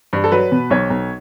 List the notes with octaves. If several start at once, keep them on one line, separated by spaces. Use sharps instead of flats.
G2
A4
F#3 B4
B2
B1 C#5
B1